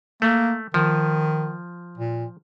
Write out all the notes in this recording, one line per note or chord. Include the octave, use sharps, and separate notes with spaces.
A3 A#3
D#3 F3
A#2